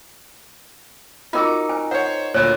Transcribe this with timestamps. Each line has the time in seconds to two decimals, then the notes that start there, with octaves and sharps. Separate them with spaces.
1.33 D#4 F4 F#4 A#4 D6
1.69 G#5
1.91 C5 C#5 F#5
2.34 D2 A#2 C#5